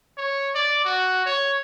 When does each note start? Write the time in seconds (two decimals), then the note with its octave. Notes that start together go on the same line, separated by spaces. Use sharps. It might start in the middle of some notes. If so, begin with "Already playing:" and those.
0.18 C#5
0.55 D5
0.85 F#4
1.26 C#5